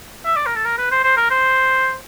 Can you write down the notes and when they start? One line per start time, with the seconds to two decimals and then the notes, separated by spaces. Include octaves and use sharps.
0.26 E5
0.36 D5
0.46 A#4
0.55 A4
0.65 A#4
0.78 B4
0.91 C5
1.04 C5
1.17 A#4
1.30 C5